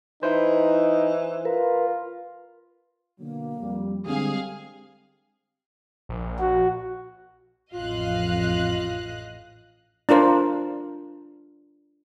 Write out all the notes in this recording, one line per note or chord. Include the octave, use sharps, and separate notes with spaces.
E3 D#4 E4 C5
F4 A#4 B4
B2 D3 F#3 A#3
F2 G3
D3 G3 G#3 C4 G#4 F5
A#1
F#4
A1 F2 F4 D#5 F5 F#6
D4 F4 A#4 C5